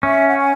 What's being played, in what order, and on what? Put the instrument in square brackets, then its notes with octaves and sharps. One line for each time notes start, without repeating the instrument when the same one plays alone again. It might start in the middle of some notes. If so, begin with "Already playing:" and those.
[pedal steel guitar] C#4 [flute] E5
[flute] F#5
G#5